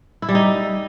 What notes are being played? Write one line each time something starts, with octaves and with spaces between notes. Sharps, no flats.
E4
G3
D#4